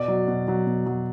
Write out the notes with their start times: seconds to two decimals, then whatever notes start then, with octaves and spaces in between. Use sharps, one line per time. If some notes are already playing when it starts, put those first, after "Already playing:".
Already playing: B2 D5
0.08 F#3
0.28 B2
0.48 F#3
0.67 B2
0.86 F#3